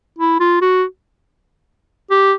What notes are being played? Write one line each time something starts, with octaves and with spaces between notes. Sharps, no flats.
E4
F4
F#4
G4